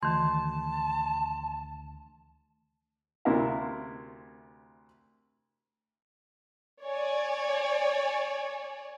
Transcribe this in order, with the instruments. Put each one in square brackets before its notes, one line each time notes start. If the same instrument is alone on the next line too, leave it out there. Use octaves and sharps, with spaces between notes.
[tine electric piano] D2 [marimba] D#3 E3 [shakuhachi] A5 [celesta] C6
[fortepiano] D2 C3 E4 A#4 E5 F5
[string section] C#5 D5 G#5